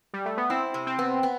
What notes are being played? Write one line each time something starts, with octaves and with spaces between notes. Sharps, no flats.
G3
A3
B3
C4 E4
C3
C4
B3
B3